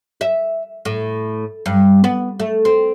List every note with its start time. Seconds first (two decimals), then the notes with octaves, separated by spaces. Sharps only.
0.21 E5
0.85 A2
1.66 G2
2.04 B3
2.40 A3
2.65 C4